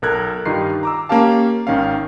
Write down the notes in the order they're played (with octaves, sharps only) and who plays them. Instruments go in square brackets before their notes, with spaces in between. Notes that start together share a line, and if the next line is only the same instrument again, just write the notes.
[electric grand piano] B1 A4 A#4 F#6 G#6
G2 D#3 D#4 F4 G4 C7
A#5 D6 E6
A#3 C#4 G4 F5 A5
G#1 D#3 C#4 F5